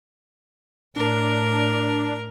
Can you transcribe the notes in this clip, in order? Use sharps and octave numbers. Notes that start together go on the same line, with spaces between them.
A2 D4 A#4